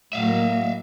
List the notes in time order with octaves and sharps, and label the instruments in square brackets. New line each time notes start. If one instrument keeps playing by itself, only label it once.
[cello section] A2 F#3 A#3 [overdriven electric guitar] E5 F5